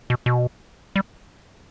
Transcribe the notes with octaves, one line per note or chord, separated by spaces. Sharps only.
B2
B2
G3